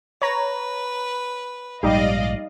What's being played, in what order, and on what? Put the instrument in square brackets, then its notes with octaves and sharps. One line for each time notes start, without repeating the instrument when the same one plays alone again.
[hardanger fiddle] B4 [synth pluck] C#5 A#5
[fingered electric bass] A#1 G#2 [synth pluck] G3 D#4 G4 [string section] D5 D#5 F5